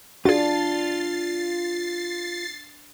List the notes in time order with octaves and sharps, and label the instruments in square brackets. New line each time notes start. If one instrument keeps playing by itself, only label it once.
[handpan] D4 [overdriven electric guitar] F4 [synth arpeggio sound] F#4 G#4 [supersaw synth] A6 C7